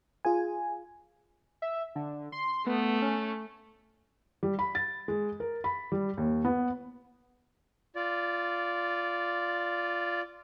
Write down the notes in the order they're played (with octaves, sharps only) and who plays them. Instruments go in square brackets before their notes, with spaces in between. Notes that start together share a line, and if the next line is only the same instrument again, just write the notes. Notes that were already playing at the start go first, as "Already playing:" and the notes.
[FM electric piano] F4 G#4 G#5
[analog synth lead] E5
D3
C6
[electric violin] A3 [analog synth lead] B3
[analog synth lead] C#4
[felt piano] G3
B5
A6
G#3
A#4
B5
G3
D#2
B3
[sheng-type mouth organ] F4 D5